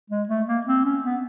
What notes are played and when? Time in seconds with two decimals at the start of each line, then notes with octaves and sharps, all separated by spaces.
0.10 G#3
0.29 A3
0.48 A#3
0.67 C4
0.85 C#4
1.04 B3